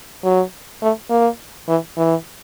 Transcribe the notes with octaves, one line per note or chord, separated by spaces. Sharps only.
F#3
A3
A#3
E3
E3